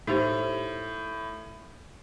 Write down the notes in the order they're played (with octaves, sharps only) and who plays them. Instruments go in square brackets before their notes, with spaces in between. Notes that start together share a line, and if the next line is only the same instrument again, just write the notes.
[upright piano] A2 [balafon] D#4 G4 C5